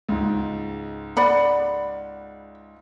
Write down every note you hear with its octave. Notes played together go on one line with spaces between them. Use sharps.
C#2 G#2
D5 F#5 B5